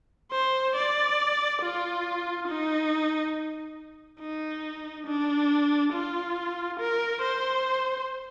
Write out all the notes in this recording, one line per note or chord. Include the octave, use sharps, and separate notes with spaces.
C5
D5
F4
D#4
D#4
D4
F4
A#4
C5